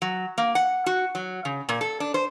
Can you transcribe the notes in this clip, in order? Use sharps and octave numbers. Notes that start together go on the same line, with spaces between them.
F#3
A#3
F#5
F#4
F#3
C#3
A#2
A4
D4
C5